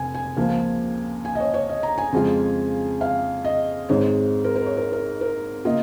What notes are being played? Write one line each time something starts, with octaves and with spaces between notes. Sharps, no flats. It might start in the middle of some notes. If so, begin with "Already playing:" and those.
Already playing: F1 G#5
G#5
C#2 C#3 F3 A#3
G#5
D#5
C#5
C#5
D#5
A#5
G#5
F2 C#3 G#3 F4
F5
D#5
G#1 G#2 G#3 C#5
A#4
A#4
C#5
A#4
A#4
A#4
C#3 A#3 F4 D#5